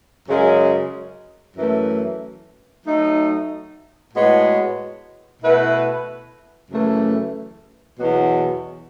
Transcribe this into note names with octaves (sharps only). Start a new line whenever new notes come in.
F#2 C#3 G#3 C#4 G#4
F#2 E3 A3
F#3 A3 D#4
A2 G#3 B3 F#4 C#5
B2 A3 E4 B4
F#2 C#3 E3 A3
E2 B2 F#3 B3 F#4